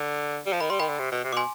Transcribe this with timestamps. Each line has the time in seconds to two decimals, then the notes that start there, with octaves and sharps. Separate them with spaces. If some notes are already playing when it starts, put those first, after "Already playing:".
Already playing: D3
0.46 G3
0.53 F3
0.61 D#3 B5
0.70 G3 C6
0.79 D#3 G5 B5
0.89 D3
0.99 C3
1.12 B2
1.24 C3
1.33 B2 G#5 C6 D6